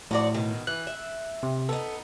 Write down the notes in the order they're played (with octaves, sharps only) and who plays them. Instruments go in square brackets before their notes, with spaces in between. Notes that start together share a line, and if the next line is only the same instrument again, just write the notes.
[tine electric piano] A2 [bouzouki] F3 F#4 D5
[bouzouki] B2 D#3
[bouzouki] E3 [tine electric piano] F#6
[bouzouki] E5
[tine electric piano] C3
[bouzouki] B3 D#4 [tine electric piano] A4